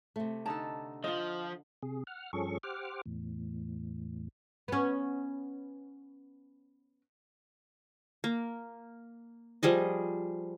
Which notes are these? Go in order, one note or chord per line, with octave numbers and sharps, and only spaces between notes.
C3 A3
D3 D#4 A4 A5
F3 F4 D#5
C3 G#4
F#5 F6
G2 F3 C#4 G#4 A4 C#6
G4 C5 F#5 D6 F6
E2 A2
B3 C#4
A#3
F3 G3 G#4 D#5